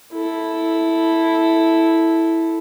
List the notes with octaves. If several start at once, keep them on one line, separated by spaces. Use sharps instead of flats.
E4 A4